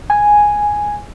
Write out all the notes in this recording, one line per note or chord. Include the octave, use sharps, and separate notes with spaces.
G#5